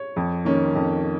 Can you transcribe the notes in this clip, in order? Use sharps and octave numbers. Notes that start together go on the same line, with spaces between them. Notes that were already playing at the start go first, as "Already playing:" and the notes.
Already playing: C#5
F2
D#3 A#3 C#4
F2